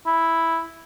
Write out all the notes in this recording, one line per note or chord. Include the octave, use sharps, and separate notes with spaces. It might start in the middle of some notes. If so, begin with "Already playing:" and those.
E4